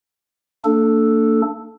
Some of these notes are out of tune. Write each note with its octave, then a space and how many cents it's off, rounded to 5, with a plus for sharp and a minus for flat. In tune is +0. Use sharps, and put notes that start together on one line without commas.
A#3 -40 D4 +0 A4 +0